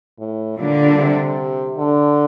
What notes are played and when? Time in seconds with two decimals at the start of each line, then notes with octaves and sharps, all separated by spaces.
0.19 A2
0.58 A#2 D3 G3 D4
0.99 C3
1.77 D3